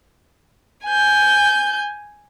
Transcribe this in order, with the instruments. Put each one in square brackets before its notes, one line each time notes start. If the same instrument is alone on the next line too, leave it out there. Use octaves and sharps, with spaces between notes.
[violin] G#5 G6